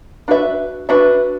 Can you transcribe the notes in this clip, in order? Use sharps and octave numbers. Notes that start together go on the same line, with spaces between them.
D4 F#4 B4 E5
D4 F#4 B4 E5